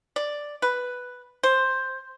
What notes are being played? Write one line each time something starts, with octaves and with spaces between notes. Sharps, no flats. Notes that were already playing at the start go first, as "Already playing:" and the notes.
D5
B4
C5